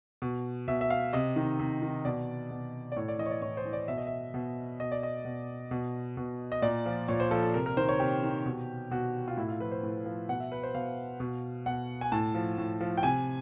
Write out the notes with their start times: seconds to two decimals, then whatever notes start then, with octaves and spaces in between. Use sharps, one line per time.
0.22 B2
0.68 B2 E5
0.81 E5
0.90 F5
1.13 C3 D#5
1.36 D#3
1.59 C3
1.82 D#3
2.05 B2 D5
2.51 B2
2.92 D5
2.96 A2 C#5
3.08 D5
3.19 E3 D#5
3.26 C#5
3.31 D5
3.42 A2 C#5
3.57 C5
3.65 E3
3.73 D5
3.88 B2 E5
3.98 D#5
4.07 E5
4.34 B2
4.79 B2 D#5
4.92 D5
5.03 D#5
5.25 B2
5.71 B2
6.17 B2
6.52 D#5
6.62 A#2 D5
6.86 F3
7.08 A#2 C#5
7.20 C5
7.31 F3 A4
7.43 A4
7.54 C3 A#4
7.66 A#4
7.77 D#3 C5
7.89 C#5
7.99 C3 G4
8.23 D#3
8.46 B2
8.91 B2 F#4
9.28 F4
9.37 A2 E4
9.48 F4
9.60 F3 B4
9.72 C5
9.83 A2
10.06 F3
10.29 B2 F#5
10.40 E5
10.52 B4
10.63 C5
10.75 B2 F5
11.20 B2
11.66 B2 F#5
12.01 G#5
12.12 A2 A5
12.34 F3
12.58 A2
12.80 F3
12.98 G5
13.03 C3 G#5